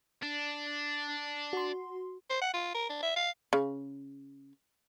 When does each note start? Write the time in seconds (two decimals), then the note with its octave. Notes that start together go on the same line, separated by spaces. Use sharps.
0.23 D4
1.53 F#4 C6
2.30 C5
2.41 F#5
2.54 F4
2.74 A#4
2.89 D4
3.03 E5
3.16 F5
3.53 C#3